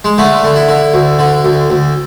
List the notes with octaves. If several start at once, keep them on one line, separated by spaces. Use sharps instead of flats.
G#3
D3 A3
D3
E4
D3
D2
D3
D2
D2